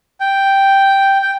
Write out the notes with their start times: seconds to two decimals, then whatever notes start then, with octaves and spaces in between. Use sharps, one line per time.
0.20 G5
1.22 G5